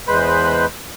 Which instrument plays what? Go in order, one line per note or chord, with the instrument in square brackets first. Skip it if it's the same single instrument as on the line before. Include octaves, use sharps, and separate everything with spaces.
[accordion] E2 G#3 B4 C5 B5